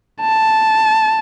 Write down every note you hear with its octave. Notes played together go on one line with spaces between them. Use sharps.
A5